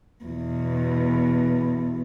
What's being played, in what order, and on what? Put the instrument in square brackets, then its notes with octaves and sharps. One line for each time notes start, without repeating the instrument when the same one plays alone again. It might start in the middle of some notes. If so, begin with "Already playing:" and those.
[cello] E2 B2